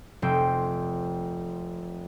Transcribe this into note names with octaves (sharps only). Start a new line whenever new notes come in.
F1 C4 G5